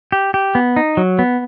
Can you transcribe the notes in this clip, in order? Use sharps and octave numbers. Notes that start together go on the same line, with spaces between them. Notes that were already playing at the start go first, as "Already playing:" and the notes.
G4
G4
B3
D#4
F#3
B3